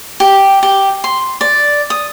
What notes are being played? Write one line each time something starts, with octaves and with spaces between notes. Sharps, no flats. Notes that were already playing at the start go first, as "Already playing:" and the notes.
G4
G4
C6
D5
D#6